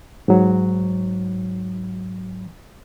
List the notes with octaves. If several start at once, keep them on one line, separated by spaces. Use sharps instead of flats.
G#2 F#3